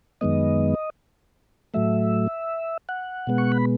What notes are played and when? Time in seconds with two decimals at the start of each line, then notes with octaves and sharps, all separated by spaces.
0.21 F#2 D#3 G#3 B3 D#5
1.74 A2 F#3 A3 E5
2.89 F#5
3.27 B2 G#3 B3
3.38 C#6
3.52 B5